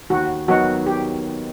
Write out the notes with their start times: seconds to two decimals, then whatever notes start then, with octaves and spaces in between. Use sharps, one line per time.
0.10 D#2 F#4
0.48 D#3 F#3 B3 D#4 F#4
0.87 G4